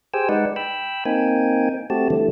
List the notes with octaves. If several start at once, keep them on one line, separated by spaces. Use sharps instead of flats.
G4 G#4 C5 G5 G#5 E6
G#3 D#4 B4 D5 F#5
G5 B5 E6
A#3 C4 D#4 G5 G#5
A3 C4 F#4 G4 A5
D3 E3 G3 A3